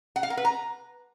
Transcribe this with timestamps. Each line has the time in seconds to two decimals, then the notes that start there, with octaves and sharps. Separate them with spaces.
0.16 F#5
0.23 F5
0.30 A#4
0.37 B4
0.45 A#5